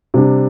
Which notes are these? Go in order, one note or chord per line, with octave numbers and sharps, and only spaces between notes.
C3 G3 D4